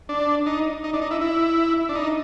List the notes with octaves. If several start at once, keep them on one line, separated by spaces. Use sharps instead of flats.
D4
D#4
D#4
D4
D#4
E4
E4
D4
D#4